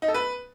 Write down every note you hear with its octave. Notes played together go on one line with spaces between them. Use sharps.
D#4
A4
B4